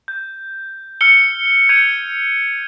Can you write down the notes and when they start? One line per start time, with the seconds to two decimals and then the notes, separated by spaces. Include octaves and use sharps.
0.08 G6
1.01 E6 F6 C#7 G7
1.69 G6 G#6 C#7 D#7 F7